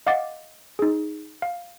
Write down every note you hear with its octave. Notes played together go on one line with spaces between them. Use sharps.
D#5 F5 F#5 D6 A6
D#4 G#4
F5